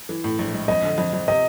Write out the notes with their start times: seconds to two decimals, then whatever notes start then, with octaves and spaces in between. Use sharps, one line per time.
0.09 E3
0.24 A2
0.39 A#1
0.53 G#3
0.68 F2 D#5
0.83 D3
0.98 F2
1.13 F2
1.28 C3 D#5